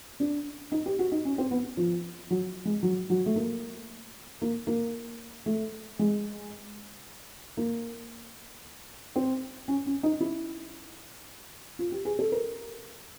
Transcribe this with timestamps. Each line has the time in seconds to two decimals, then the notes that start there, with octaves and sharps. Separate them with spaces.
0.20 D4
0.72 D#4
0.86 G4
0.99 F#4
1.12 D#4
1.25 C#4
1.38 C4
1.51 B3
1.77 F3
2.30 F#3
2.65 G#3
2.83 F#3
3.10 F#3
3.26 A3
3.36 A#3
4.42 A#3
4.67 A#3
5.46 A3
5.99 G#3
7.57 A#3
9.16 C4
9.68 C#4
9.86 C#4
10.03 D#4
10.21 E4
11.79 F4
11.92 G4
12.05 G#4
12.19 A4
12.32 A#4